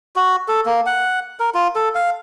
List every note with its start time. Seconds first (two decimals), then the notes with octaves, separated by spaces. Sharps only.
0.16 F#4
0.48 A4
0.66 A#3
0.86 F#5
1.40 A#4
1.54 F4
1.75 A4
1.95 F5